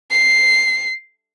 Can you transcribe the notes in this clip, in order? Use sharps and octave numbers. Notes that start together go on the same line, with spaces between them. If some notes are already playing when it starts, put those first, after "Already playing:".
C7